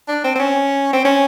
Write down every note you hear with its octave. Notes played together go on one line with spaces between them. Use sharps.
D4
C4
C4
C#4
C4
C#4